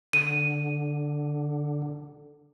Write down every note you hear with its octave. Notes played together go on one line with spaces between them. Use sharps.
D3 D#7